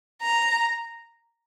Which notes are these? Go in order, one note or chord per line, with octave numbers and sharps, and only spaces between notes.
A#5